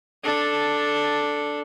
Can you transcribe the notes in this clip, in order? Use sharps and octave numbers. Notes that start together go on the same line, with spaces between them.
D4 A4